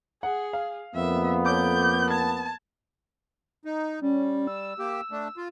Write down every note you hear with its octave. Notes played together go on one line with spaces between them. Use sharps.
G#4 F#5
F5
F2 A#3 B3 E5
A4 C#5 D6 G6
A5 G#6
D#4
G3 C#4
E6
A#3 G4
A3 D4
F4